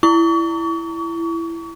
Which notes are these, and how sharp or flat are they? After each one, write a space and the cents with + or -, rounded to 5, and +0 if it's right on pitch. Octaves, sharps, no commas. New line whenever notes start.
E4 +15 C#6 +40